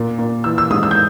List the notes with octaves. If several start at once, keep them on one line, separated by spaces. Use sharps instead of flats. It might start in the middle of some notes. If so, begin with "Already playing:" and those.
Already playing: A#2
A#2
E3 E6
E6
G#2 D#6
E6
G6